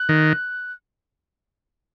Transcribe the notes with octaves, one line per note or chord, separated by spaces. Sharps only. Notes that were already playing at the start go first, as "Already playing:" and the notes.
Already playing: F#6
D#3